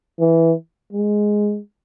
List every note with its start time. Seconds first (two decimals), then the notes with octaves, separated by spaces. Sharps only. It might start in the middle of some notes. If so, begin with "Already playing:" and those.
0.20 E3
0.93 G#3